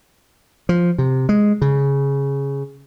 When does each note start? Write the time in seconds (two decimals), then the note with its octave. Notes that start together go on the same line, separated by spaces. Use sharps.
0.69 F3
0.98 C3
1.29 G#3
1.62 C#3